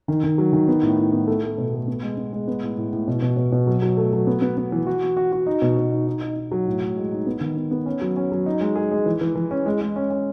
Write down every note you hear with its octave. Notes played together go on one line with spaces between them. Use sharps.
D#3
D#3
F#3
D#3
B3
A2
A2
B3
A3
A3
B2
A3
B3
G#3
B3
G#3
B3
A2
A2
A2
B2
B2
B2
B2
F#3
F#3
A3
F#3
B3
B3
B3
E3
F#4
F#4
F#4
F#4
D#4
B2
B2
D#4
D#4
D#4
D#4
F#3
A2
A2
G#3
D#4
B3
D#3
B3
B3
C#4
F#3
C#4
F#3
D#4
G#3
G#4
G#3
E3
E3
E3
C#4
G#3
G#3
C#4
C#4